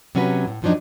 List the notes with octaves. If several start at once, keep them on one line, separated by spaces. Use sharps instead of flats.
C3 F#3 C#4 E4 F#4 B4
A2
F#2 A2 F3 F#3 D4 D#4